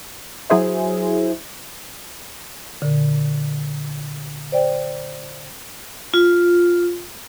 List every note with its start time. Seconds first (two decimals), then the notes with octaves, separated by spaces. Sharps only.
0.50 F#3 E4 G#4 C5 E5
2.82 A#2 D3
4.52 C5 D5 G5
6.14 F4